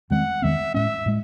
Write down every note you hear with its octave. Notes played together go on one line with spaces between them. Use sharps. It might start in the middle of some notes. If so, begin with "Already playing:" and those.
E2 D#3 G#3 C4 F#5
E2 D#3 G#3 C4 E5
A2 G#3 C#4 E5
A2 G#3